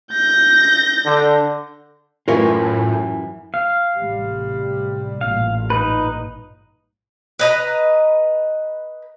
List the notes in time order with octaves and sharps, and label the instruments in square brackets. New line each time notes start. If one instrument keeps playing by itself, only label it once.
[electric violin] G6 A#6
[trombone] D3
[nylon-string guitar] F#2 E3 G#5 [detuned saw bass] A2 [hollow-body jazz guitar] F4 A#4 C#5
[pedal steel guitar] F5
[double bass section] A1 C3 G3
[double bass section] A1 G2 A#2 [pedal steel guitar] F5
[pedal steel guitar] D#4 B4
[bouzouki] B4 D#5 A#5